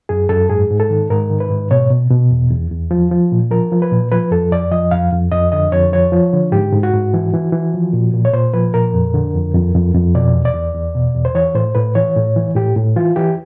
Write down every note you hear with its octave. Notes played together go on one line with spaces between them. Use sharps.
F#2 G#4
F#2 A4
G#2 G#4
G#2
A4
D#3
G#2 A#4
D#3
B4
G#2
B2 C#5
B2
B2
E2
E2
E2
F3
F3
A#2
F3 A#4
F3
B4
A#2
F3 B4
F2 A4
F2 D5
F3 D#5
F2 F5
F2
F2 D#5
D3 D#5
F2 C#5
F3 C#5
F3
D3
G#2 G4
G#2
F#4
G#2
E3
E3
E3
F3
A#2
A#2
C#5
A#2 C5
F3 B4
A#2 A#4
F2
D3
F2
F2
F2
F2
B2 D5
E2
D5
E2
E2
B2
E2
C5
E3 C#5
A2 C5
A2 B4
E3 C#5
A2
E3
A2 G4
A2
E3 F4
E3 G4